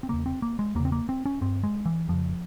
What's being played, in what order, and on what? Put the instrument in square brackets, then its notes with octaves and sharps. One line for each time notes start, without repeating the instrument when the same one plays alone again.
[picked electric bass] C4
E2 C#3 A#3
C4
A#3
G#3
E2 A#3
C#3
C4
A#3
C4
C#4
G2 C4
G#3
E3
F2 C#3 F3